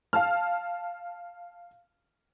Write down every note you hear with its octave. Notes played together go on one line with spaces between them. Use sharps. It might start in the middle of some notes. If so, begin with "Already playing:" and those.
F5 A5 F6